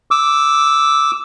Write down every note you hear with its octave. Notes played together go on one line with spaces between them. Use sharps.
D6 E6